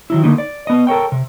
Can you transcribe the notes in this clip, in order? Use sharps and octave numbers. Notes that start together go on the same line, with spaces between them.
D#3 F#3 E4
D3 A3 A#3 D#4
D5
B3 D#5
A4 A#4 C#5 G5
C3